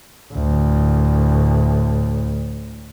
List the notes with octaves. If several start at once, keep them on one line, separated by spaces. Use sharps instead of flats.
D2 A2